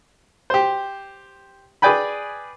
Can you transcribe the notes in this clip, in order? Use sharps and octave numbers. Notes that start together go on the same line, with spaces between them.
G4 C5
G#4 B4 D5 G5 G#5 B5